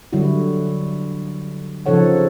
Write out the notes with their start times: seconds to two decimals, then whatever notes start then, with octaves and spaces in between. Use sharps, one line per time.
0.13 D3 F#3 G3 E4 F#4
1.86 C#3 F3 D#4 A4 C#5 F#5